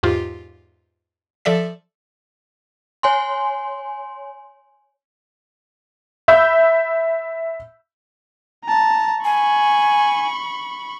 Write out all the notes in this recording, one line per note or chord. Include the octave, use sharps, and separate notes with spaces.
E2 G#2 F4 G4
F3 A4 D5 E5 B6
C#5 G#5 C6
E5 B5 E6 G6 B6
A5 A#5
G#5 B5 C#6